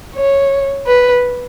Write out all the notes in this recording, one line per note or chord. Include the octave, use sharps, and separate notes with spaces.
C#5
B4